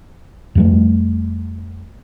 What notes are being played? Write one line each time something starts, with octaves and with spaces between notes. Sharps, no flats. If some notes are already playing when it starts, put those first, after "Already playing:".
F2 G3 A3